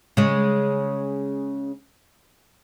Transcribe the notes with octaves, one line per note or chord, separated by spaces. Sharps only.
C#3 G#3